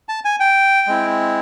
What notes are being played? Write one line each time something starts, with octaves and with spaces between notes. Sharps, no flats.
A5
G#5
G5
G#3 C4 E4